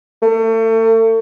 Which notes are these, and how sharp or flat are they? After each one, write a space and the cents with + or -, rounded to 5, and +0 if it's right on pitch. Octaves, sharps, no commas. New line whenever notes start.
A3 +35